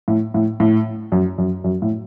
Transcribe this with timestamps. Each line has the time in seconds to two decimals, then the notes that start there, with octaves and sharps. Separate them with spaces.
0.08 A2
0.34 A2
0.60 A2
1.12 F#2
1.38 F#2
1.64 F#2
1.82 A2